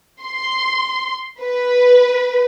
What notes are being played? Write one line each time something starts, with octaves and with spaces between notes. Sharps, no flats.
C6
B4